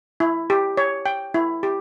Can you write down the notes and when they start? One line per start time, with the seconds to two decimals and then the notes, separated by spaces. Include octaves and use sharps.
0.20 E4
0.50 G4
0.77 C#5
1.06 G5
1.34 E4
1.63 G4